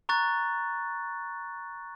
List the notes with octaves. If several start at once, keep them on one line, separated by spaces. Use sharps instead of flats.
A#5 C#6 F#6 A6